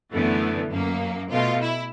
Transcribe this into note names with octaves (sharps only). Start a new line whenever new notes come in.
F#2 D3 E3 A3 B3
F#2 A#3
B2 A3 F4
E4